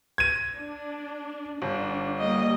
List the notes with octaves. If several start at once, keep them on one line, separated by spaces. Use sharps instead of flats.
G#6 D#7
D4
G1 D4
G3 A#3 D#5